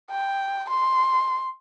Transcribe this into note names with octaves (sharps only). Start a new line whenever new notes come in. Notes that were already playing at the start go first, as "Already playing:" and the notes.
G5
C6